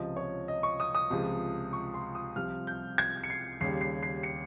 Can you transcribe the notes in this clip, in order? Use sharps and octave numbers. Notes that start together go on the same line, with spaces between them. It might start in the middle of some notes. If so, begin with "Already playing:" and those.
Already playing: C#2 C3 F3 D#5
C#5
D#5
C#6
D#6
D#6
C#2 C3 F3 G#3
C#6
C6
D#6
C2 C3 F3 F6
G6
G#6
C#7
C7
D#2 C#3 G3 C7
C7
C7
C#7